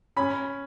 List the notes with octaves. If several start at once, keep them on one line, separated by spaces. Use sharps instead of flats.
C#4 B5